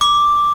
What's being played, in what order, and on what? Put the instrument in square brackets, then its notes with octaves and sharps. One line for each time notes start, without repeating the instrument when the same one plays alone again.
[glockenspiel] D6